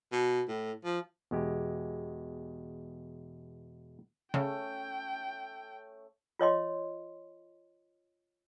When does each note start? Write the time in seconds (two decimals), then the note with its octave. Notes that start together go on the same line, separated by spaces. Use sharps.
0.12 B2
0.48 A2
0.84 F3
1.31 E2 B2 G#3 G4
4.34 C#3 A3 C#4 G5
6.39 F4 C#5 D#5 C6